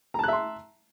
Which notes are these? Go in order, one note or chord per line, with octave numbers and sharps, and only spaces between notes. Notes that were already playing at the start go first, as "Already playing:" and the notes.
E5 A5 A#5 C6 F#6